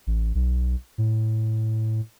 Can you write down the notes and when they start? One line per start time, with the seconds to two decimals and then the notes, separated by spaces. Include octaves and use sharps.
0.07 A1
0.35 B1
0.98 A2